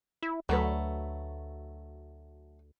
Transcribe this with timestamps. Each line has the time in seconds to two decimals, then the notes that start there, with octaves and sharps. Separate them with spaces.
0.23 E4
0.49 D2 F#3 A3 B4